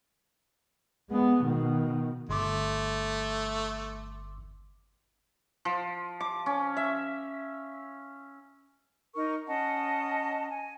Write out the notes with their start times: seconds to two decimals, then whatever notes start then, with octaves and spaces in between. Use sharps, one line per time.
1.10 G#3 B3
1.44 B2 D#3
2.29 G1 A3 C6 D6
5.65 F3
6.20 D6
6.46 C#4
6.77 E5
9.14 D#4 A#4 C#6
9.47 C#4 D#5 F#5 A5
10.50 G#5